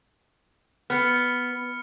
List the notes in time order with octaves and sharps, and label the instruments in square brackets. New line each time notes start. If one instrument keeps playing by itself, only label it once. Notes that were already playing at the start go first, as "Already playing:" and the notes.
[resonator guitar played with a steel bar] B3 [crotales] F6 C#7